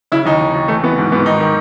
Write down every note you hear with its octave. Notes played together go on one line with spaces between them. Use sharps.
C#3 E4
D#2 D#4
E3
D#2
E3 A3
E3 B3
G#2
G#2 B3
D#3 D#4
D#3